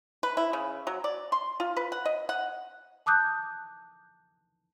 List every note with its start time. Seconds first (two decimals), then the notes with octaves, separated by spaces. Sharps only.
0.23 B4
0.37 E4
0.53 C#3
0.87 F#3
1.04 D5
1.32 C6
1.60 F4
1.77 B4
1.92 F#5
2.06 D#5
2.29 F#5
3.06 A5 D6 D#6 F#6 G6